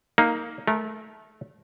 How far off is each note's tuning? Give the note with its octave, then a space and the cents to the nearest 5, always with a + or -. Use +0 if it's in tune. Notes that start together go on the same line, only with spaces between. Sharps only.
A#3 +0 D#4 +15
A3 -25 A#4 +0 A#5 -5